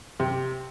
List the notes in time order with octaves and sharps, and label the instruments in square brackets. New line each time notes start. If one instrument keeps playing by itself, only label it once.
[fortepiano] C3